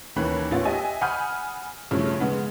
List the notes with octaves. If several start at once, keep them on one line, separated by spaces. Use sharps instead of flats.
D#2 E3 A#3 C#4 B5 F#6
A1 B3 C#4 F4 A6
G4 D#5 E5 G#5
F#5 G#5 B5 D#6 F6 G6
G2 C#3 F3 A3 C#4 E4
C#3 G#3 B3